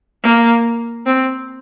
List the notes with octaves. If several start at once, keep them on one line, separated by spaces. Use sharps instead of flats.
A#3
C4